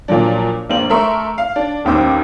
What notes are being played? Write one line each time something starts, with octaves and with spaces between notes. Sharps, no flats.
A#2 F3 F#3 D4
A#1 A#3 C5 F#7
A3 A#4 E5 C6 C#6
F5
D4
A1 D#2 C5 D6 E6